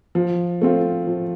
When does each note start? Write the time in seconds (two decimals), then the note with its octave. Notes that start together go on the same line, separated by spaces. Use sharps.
0.15 F3
0.61 A3 C4 F4
1.07 F3